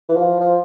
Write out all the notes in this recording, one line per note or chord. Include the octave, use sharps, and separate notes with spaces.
E3
F3
F3